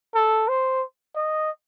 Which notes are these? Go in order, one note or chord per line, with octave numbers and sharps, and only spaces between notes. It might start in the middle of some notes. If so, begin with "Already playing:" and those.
A4
C5
D#5